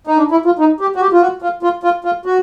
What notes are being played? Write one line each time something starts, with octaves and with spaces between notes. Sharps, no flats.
D#4
D4
E4
F4
D#4
G4
F#4
G4
F4
F#4
F4
F4
F4
F4
F#4